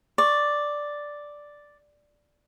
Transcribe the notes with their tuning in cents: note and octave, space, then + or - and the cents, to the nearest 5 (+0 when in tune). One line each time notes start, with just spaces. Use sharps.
D5 +0 C#6 -15